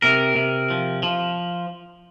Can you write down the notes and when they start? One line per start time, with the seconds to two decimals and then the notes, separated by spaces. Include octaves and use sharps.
0.02 C3 A#4
0.36 C3
0.70 F3
1.03 F3